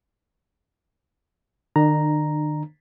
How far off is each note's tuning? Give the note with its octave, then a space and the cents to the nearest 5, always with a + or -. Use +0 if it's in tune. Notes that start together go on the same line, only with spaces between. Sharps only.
D#3 -40 D4 +40 A#5 +0